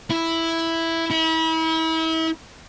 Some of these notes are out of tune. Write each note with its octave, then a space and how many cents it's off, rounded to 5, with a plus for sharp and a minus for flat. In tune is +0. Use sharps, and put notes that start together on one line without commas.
E4 +0
E4 -35